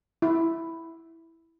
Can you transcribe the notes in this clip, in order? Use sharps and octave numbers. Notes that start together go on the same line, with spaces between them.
E4